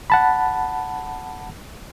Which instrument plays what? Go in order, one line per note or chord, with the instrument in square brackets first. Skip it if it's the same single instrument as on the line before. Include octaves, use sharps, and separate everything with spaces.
[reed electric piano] F#5 A5 B5